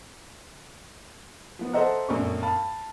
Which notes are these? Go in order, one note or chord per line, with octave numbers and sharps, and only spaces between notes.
F3 B3
A4 C5 D#5 E5 F#5 A#5
A#1 F#2 B2 A3 C#6
F5 A5 B5